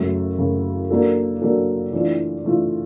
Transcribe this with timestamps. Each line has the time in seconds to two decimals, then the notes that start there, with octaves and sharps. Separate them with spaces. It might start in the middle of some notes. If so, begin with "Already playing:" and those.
Already playing: F#2 C#3 F#3 A3
0.38 F#2 C#3 F#3 A3
0.91 F#3 A#3 D4 F#4 A4
1.42 F#3 A#3 D4 F#4 A4
1.93 E3 A3 D4 F4
2.44 E3 A3 D4 F4